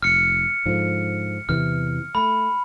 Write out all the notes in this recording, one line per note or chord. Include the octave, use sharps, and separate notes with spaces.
F1 F6 C#7
G#2 D3 F3
E2 C3 E3 F6
A3 B5